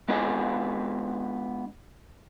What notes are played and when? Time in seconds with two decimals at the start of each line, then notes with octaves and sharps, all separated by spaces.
0.08 G#3 B3 D4 F4 D#5 G#5